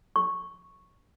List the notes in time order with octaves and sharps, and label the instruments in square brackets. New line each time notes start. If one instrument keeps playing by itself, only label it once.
[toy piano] C#6